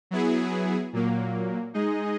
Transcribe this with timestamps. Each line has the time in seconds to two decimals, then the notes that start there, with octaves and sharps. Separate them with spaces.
0.11 F#3 B3 E4 G#4
0.93 A#2 F#3 A#3
1.74 G#3 D#4 G#4 D#5